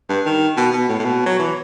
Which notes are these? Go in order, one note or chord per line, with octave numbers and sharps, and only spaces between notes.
G2
D#3
B2
B2
A2
A2
B2
F#3
E3